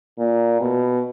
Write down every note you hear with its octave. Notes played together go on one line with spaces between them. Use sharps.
A#2
B2